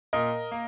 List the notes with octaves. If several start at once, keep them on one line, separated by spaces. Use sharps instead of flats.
A#2 A#4 D#5
A#3